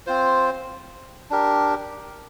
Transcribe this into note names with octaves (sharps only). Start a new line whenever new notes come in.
C4 F4 C5
D4 G4 A#4